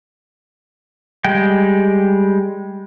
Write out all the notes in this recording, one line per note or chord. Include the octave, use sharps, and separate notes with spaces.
G3 G#3 G5